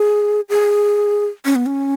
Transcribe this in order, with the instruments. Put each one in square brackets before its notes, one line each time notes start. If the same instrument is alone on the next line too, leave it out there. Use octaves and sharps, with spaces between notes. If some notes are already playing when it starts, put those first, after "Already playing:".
Already playing: [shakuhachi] G#4
G#4
C#4
B3
C#4